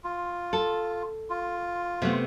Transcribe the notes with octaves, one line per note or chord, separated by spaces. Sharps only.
F4
A4
F4
C3 A3 B3